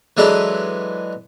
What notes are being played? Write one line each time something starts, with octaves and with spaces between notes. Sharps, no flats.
E3 F#3 G#3 D4 A4 B4